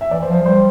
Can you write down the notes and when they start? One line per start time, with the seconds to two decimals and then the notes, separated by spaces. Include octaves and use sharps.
0.01 E5
0.11 E3 D5
0.22 C5
0.29 F3
0.34 C5
0.41 F3
0.46 G3 C5